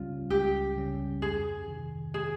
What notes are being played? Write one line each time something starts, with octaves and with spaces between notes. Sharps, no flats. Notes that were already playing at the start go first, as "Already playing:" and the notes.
Already playing: C#2 C#3 G3 C#4 F4
C#2 G4
C#3 G3 C#4
F2 G#4
C3 D#3
G#4